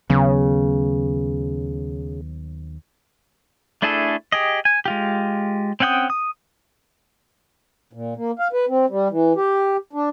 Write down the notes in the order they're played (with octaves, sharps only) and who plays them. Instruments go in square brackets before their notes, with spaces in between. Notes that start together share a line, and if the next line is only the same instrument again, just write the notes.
[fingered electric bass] D#2 F#3 B3 [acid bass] C#3
[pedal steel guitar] A3 D4 E4 G#4 A4
G4 G#4 D#5
G#5
G#3 F4 G4
C4 C#4 F#5 G5 D#6
D#6
[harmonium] A#2
A#3
F5
B4
C4
G3
E3
G4
D4